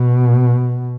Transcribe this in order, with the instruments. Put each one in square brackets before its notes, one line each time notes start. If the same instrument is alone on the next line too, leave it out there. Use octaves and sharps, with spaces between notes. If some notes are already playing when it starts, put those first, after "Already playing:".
Already playing: [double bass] B2